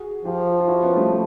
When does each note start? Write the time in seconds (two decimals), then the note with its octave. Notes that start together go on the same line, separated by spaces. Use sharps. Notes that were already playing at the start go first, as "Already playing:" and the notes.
Already playing: F#4 G#4
0.25 F3 F4 G4
0.60 F4
0.68 E4 F#4
0.82 B3 C#4
0.96 G3 A3